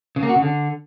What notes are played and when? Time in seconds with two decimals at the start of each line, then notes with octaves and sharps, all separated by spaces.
0.16 C#3
0.23 A#3
0.29 F#4
0.35 C#3
0.42 D3